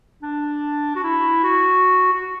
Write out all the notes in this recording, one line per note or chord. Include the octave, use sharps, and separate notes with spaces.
D4
F#4
E4
F#4
F#4